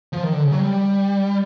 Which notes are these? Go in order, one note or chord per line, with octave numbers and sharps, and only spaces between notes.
F3
D#3
D3
C#3
F#3
G3